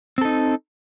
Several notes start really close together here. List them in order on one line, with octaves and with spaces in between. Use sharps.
C4 A4 D#4